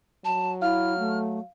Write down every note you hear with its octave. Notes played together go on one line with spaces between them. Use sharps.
F#3 A5
E4 F5 F6
A3